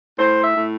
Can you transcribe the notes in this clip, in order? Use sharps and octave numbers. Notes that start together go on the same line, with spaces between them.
A2 C5
E5
A2